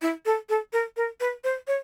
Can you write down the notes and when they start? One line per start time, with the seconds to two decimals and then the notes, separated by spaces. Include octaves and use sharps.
0.02 E4
0.26 A4
0.49 A4
0.73 A#4
0.97 A#4
1.20 B4
1.44 C5
1.67 C#5